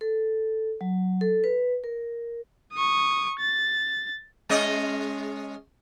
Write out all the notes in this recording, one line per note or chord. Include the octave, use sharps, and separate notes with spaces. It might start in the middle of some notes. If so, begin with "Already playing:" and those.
A4
F#3
A4
B4
A#4
C#6 D#6
A6
G#3 C#4 D#5